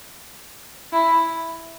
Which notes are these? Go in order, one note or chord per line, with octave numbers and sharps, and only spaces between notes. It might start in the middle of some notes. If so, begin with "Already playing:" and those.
E4